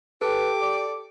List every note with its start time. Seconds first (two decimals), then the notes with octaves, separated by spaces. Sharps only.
0.21 G4 A4 B4 D6
0.62 D5